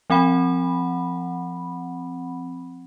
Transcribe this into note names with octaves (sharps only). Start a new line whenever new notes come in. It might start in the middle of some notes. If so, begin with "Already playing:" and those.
F3 C4 F#5 B5